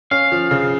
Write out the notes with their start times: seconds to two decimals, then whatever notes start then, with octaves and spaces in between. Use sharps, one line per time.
0.11 C#4 F5
0.32 F3
0.51 C#3